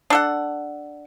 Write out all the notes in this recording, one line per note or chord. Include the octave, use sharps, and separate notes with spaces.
D4 A4 F#5